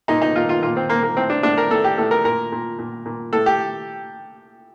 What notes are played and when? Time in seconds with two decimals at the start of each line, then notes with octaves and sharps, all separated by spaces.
0.08 A#2 D#4
0.22 D#4
0.36 A#2 F4
0.49 F4
0.63 A#2 F4
0.76 C4
0.90 A#2 A#3
1.03 A#3
1.17 A2 C4
1.30 D4
1.43 A2 D4
1.58 A#4
1.71 A2 A4
1.84 G4
1.98 A2 A4
2.11 A#4
2.24 A#2 A#4
2.52 A#2
2.79 A#2
3.05 A#2
3.33 A2 A4
3.46 G4